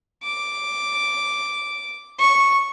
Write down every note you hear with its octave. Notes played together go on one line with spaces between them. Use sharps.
D6
C#6